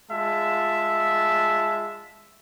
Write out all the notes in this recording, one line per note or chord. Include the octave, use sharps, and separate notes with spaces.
G#3 F4 E5 A5